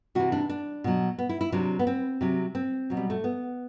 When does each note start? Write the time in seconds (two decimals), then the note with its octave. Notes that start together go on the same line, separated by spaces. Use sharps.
0.15 C3 E3 F#4
0.32 D4
0.49 D4
0.84 B2 F#3
1.18 B3
1.29 E4
1.41 E4
1.52 C3 F#3 D4
1.79 B3
1.87 C4
2.21 C3 F#3
2.55 C4
2.90 B2 F#3
2.97 G3
3.10 A3
3.24 B3